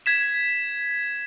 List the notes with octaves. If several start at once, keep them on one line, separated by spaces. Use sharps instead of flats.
G#6 B6 E7